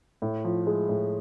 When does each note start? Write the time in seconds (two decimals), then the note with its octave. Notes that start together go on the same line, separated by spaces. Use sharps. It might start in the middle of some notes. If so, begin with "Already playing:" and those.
0.22 A2
0.44 F3
0.67 G#3
0.89 A2